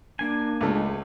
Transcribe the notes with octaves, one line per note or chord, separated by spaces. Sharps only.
A#3 D4 G#5
C#2 G#3 A3